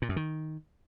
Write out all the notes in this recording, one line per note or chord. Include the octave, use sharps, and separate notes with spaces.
A#2
F#2
D#3